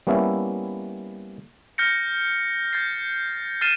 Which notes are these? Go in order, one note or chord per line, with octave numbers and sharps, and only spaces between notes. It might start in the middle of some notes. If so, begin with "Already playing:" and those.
G3 A#3 B3 C#4 E4 E5
F6 G6 A#6 C#7
G6 A6 C7
F6 A6 C7 D#7 E7